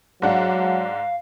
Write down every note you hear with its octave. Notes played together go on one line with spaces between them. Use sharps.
G#2 F#3 D4 F5 F#5